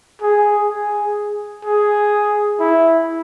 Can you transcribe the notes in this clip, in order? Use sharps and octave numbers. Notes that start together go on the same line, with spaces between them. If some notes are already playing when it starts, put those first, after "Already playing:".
G#4
G#4
G#4
E4